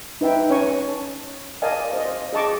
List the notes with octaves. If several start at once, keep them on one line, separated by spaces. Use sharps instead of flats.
D#4 B4 E5 G5
C#4 C#5 G#5 A#5 C#6
A5
A#4 D5 D#5 F5 G#5 A5
C5 D#5
G#4 D#5 A5 C#6 D6